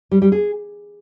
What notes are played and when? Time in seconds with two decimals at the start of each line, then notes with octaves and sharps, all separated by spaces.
0.11 G3
0.22 G3
0.32 G#4